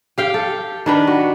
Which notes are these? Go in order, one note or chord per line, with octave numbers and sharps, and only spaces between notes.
G4 F5 G5
A4
D#3 D4 B4
F#4